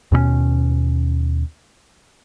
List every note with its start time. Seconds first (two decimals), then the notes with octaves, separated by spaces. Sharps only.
0.12 D#2 B2 A3 C#4